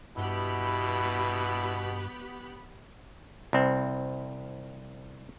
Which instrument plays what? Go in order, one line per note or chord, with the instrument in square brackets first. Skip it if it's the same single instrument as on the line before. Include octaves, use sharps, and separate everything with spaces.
[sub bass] G2 [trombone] B2 [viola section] B3 G4 B5 [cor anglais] E4
[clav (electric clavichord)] C2 C4